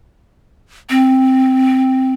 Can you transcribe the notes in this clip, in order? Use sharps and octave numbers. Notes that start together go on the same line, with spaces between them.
C4